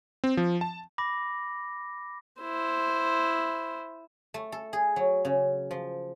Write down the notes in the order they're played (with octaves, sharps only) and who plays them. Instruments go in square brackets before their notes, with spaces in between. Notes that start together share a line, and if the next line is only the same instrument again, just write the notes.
[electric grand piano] C4
F3
A5
[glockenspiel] B5 D6 A#6
[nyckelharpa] E4 C5
[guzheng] A3
A4
G#4
F#3
C#3
F3